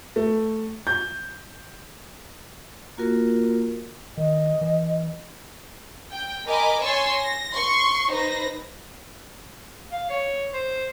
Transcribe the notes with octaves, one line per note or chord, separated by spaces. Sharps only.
A3
G6
A#3 F4 F#4 A#4
D#3 D#5
E3
G5
A#4 D#5 G#5 B5 D6
C#5 G#5 C6 C#6 E6 A6
A#6
C6 C#6
D#4 B4 C5 A#6
F5
C#5
C5